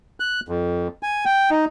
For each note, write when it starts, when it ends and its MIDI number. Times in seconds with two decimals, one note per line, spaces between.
0.20 0.40 90
0.48 0.88 41
1.03 1.25 80
1.25 1.50 79
1.50 1.65 63